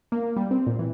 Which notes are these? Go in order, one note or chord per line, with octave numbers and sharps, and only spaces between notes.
A#3
G3
C4
A#2
E3